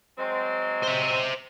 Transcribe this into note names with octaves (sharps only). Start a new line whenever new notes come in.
F#3 G#3 C4
C5 E5